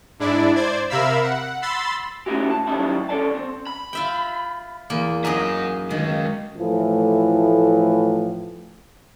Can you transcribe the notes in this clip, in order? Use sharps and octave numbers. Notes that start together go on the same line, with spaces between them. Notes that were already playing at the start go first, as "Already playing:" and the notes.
G#2 D4 E4 D5
C5 D5 G#6
C3 A#4 E5 F5 B5 E6
F#5
B5 C6 E6 A6
A3 C#4 D#4 E4 F#4 G4
A5
F#3 G3 B3 C#4 D#4 E4
C#4 A4 D5 A5
C4
B5
F4 E5 G5
E2 A#3
F#2 D#4 G#4 G#5 A#5
D#3 G#3 C#4
A2 E3 F3 A3